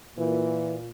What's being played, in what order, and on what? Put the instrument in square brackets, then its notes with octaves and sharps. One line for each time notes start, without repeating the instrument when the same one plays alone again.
[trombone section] A#2 [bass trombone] E3